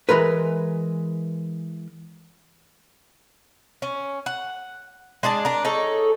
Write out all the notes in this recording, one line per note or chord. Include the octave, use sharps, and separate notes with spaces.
E3 G#3 A#4 B4
C#4
F#5
G#3 D4 G#4 A5
D4 A#4
D#4 G#4 A4 C#5